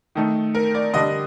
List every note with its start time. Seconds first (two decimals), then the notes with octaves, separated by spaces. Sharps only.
0.15 D#3 A3 D#4
0.55 A#4
0.74 D5
0.94 D3 G3 D4 D#5